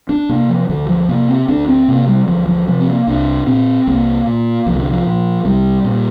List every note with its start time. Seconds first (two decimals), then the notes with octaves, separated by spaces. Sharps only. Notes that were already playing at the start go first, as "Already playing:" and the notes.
0.09 D4
0.29 C3 A#3
0.49 F3
0.69 D2 D3
0.89 F3
1.09 C3 A#3
1.28 C4
1.48 D2 D4
1.68 C4
1.88 C3 A#3
2.08 G3
2.28 D2 F3
2.48 F3
2.67 C3 F3
2.80 C4
2.87 A#3
3.07 C2 D4
3.46 A#2 C4
3.87 C2 A#3
4.26 A#2
4.66 C2 F3
4.79 D3
4.92 F3
5.06 A#2
5.45 C2 G3
5.85 A#2